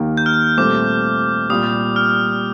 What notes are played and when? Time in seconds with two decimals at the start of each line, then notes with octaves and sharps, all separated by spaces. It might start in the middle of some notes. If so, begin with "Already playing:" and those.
Already playing: D#2 D#3 A#3
0.17 G6
0.26 F6
0.57 C2 A#2 A3 C4 D6
1.50 C2 A#2 G3 D#6
1.96 F6